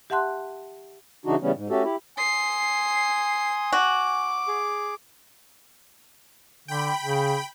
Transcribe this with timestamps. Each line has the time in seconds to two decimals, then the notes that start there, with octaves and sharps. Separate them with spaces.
0.10 G4 E5 F#5 A5 C6 F#6
1.26 C#3 E3 D4 D#4 F#4
1.42 C#3 E3 G3 B3 C#4
1.55 G#2
1.70 A3 C#4 F#4 G4 A4
1.84 E4 G4
2.18 G#5 C6 D#6 C7
3.72 F#4 D6
4.48 G#4
6.68 D3 G5 B5
7.03 C#3